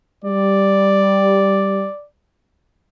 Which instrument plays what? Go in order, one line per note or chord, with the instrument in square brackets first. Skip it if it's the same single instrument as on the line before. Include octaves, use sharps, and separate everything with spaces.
[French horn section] G3 [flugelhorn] D5